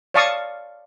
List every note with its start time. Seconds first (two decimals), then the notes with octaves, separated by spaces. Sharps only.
0.14 C#5 D5 F5 A5 C#6 D#6